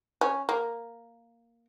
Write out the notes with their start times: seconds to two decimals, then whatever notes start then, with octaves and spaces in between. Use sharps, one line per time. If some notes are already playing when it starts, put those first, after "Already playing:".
0.21 C#4
0.49 A#3